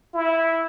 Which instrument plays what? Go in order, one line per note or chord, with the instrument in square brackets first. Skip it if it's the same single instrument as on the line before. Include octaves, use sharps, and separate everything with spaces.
[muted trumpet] E4